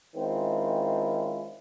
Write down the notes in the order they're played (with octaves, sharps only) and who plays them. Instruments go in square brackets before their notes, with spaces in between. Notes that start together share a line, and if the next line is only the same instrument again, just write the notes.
[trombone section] D#3 G#3 C4 C#4 E4 F4